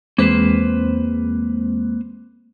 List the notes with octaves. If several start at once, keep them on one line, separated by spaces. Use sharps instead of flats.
E2 G#3 A#3 C4 B4 C5